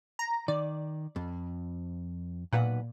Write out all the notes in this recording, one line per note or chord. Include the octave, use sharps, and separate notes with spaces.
A#5
D#3 D5
F2
B1 A#2 B4 F#5